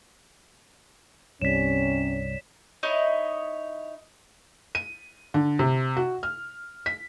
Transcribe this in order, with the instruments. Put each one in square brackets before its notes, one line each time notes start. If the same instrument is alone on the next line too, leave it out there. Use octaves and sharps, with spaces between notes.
[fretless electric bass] C2 G2 [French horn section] C3 C#4 [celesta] C#5 D5 [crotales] B6 E7
[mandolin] D#4 E4 C#5 D#5
[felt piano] D#7
D3
C3
F#4
F6
B6